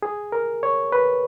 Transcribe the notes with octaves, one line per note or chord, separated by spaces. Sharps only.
G#4
A#4
C#5
B4